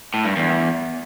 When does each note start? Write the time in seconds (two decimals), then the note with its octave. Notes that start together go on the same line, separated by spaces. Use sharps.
0.14 A2
0.25 G2
0.36 E2